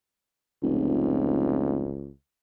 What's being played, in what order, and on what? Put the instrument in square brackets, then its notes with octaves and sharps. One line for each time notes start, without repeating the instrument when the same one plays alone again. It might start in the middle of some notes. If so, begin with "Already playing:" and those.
[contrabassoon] F1 [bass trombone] C#2